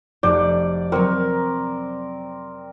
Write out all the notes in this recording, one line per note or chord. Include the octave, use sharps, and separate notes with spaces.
F1 F#4 D5 G6
F#3 C4 F#4 A#4